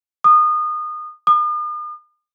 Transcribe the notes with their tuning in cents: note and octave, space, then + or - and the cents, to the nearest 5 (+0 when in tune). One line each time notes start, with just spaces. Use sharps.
D#6 -25
D#6 -45